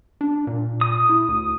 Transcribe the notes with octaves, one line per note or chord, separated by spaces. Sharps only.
D4
A#2
D#6
E4
D2